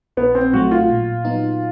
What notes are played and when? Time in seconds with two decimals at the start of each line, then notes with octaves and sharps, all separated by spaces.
0.17 A#1 B3
0.35 C4
0.53 A2 F#3 A3 F#4
0.71 F4
0.90 A#2
1.25 F#3 B3 D#4